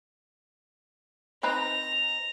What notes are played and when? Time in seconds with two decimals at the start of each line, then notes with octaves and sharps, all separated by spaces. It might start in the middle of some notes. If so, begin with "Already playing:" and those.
1.43 C4 D#4 B4 A#5